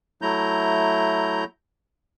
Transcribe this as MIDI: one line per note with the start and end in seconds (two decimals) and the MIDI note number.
0.22 1.44 54
0.22 1.44 57
0.22 1.44 64
0.22 1.44 82
0.22 1.44 91